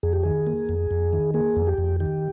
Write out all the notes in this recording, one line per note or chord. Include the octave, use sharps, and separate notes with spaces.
F2 G#4
G4
D#3 G#4
A#3
F2
F2
D#3
A#3 G#4
F2
G4
F2
D#3 G4